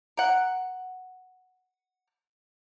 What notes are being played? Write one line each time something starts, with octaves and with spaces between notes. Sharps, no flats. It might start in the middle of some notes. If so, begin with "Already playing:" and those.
A#4 F#5